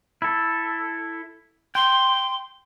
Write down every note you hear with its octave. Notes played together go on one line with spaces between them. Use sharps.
E4 A4
G5 C6